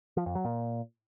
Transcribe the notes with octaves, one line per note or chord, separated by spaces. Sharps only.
F3
F2
F#3
A#2